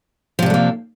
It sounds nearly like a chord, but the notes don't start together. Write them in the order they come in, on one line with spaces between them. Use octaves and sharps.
F3 C3 D4 A3 A#3